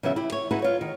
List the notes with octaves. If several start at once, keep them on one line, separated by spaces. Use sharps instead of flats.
C#3 E3 F#3 B3 E5
E4 G4
C#5
D#4 E4 F#4 G#4 B4
F4 C#5
D#3